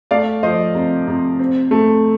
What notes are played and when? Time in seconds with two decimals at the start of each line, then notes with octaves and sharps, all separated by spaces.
0.11 A3 D5 F5
0.43 F3 C5 D#5
0.75 C3
1.07 C3
1.39 C4
1.71 A3